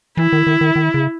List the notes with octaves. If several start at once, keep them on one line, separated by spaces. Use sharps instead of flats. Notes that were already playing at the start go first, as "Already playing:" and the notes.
E3 E4
D#3
D#3
D#3
D#3
C#3